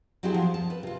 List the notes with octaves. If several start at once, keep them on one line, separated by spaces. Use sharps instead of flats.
F#3 C4 E4 G4 G#4
F3
A5
B4
C3 F4